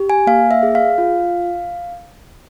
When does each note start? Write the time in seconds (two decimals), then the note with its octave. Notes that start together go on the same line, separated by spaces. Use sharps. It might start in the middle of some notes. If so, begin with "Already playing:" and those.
Already playing: G4
0.10 G#5
0.27 A#3 F5
0.51 E5
0.63 G#4
0.75 F5
0.98 F4